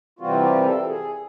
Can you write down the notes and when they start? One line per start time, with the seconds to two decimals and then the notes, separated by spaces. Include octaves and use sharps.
0.19 C3 E3 G3 C4 F4 F#4
0.42 G4
0.56 A#4
0.65 A4
0.87 G#4